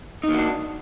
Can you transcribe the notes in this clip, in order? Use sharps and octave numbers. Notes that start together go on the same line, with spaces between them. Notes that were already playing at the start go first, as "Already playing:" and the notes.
A#3 D4 D#4 F#4